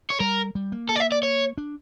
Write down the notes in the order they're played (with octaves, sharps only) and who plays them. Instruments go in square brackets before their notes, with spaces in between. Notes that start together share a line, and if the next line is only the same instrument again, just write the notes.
[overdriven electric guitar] C#5
[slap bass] G3 [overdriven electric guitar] A#4
[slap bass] G3
A#3
[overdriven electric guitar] A4
D5
E5
D5
C#5
[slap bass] D4